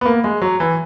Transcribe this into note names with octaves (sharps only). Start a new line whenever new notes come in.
B3
A#3
G#3
F#3
E3